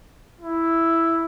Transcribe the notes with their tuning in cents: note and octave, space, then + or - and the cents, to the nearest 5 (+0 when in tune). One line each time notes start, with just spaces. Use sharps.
E4 +0